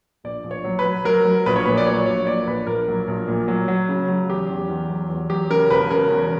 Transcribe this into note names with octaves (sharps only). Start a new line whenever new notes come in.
A#1 D5
A#1
C#5
F#3
B4
F#3
F#3 A#4
F#3
A#1 B4
C#5
A#2 B4
D5
F#3 C#5
A#1 C#5
A#2 D5
A#1 B4
A#1 A#4
F#3
A#1
A#2
F#3
F#3
C#3
F#3
E2 G4
E2
E2
F#3
E2
F#3 G4
C#3 A#4
E1 B4
C#3 A#4
E2